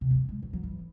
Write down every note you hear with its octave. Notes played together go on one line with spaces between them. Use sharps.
C3
E3
F#3
G#3
F#3
F#3
E3